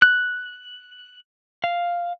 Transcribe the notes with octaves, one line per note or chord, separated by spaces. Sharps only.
F#6
F5